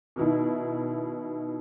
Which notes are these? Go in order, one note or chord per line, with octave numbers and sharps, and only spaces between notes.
B2 D#3 E4